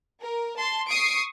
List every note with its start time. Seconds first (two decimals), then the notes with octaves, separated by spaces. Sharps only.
0.23 A#4
0.59 A5 C6
0.90 C#6 D#6 C7 D7